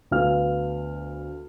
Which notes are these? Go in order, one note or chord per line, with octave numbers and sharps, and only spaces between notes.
D2 B3 F5 F6